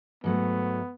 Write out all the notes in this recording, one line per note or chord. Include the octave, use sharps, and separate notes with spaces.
G#2 F#3 A3 B3